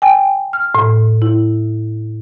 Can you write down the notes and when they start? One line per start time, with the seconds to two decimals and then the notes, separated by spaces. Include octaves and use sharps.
0.02 G5 G#5
0.53 F6
0.75 A2
1.22 E4